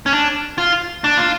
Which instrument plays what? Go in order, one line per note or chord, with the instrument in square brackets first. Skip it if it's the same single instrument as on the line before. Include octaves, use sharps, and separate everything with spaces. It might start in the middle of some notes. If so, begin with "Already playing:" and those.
[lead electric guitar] C#4
D4
F4
D4
F4